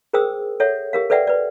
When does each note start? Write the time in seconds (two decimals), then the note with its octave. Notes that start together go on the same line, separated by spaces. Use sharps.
0.13 G#4 A#4 C5 G5 D#6 E6
0.60 A4 C#5 E5 F#5
0.93 G4 A#4 F5
1.10 A4 B4 D5 E5 F#5 G5
1.27 B4 D5